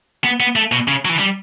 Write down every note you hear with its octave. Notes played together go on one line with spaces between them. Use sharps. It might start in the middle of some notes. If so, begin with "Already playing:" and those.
B3
B3
A3
B2
C#3
F#3
E3
G3